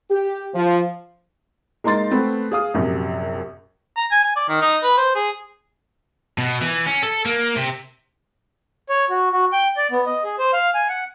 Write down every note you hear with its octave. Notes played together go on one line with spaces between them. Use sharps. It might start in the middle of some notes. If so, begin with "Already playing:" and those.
G4
F3
G#3 A#3 D#4 C6 A6
A3 B3 C4 B4
G#4 F5 D#6
A#1 F#2 C3
A#5
G#5
G#5
D5
D#3
D#4
B4
C5
G#4
B2
E3
C#4
A4
A#3
C3
C#5
F#4
F#4
G5
D5
B3
D#5
G#4
C5
F5
G#5
F#5